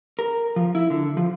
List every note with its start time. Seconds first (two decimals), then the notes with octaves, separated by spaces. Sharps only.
0.19 A#4
0.56 F3
0.75 E4
0.90 D3
1.17 F3